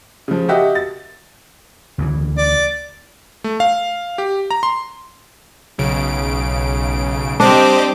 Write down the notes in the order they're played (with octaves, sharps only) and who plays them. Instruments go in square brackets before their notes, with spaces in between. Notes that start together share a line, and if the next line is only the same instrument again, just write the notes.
[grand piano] C#3 F3
F#4 G4 D#5 E5
A6
[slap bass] D2 C#3 E3
[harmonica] D5
[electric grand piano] A3
F5
G4
A#5
C6
[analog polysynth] B1 C#3 D7
[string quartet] G3 C4 G4 [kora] D4 [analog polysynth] C5 D#5 D6